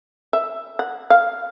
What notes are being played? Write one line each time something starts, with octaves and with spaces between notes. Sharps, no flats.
E5
F#5
F5